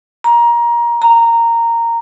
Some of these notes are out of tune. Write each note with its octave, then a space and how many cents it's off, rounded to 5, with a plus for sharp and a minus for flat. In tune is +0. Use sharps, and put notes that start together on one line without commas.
A#5 +20
A#5 -10